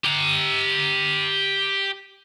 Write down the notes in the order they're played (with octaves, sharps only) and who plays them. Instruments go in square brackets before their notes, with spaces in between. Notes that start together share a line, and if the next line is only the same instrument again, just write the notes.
[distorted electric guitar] G4 A#5